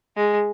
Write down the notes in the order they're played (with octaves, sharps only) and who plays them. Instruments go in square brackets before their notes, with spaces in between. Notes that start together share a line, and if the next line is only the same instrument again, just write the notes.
[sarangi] G#3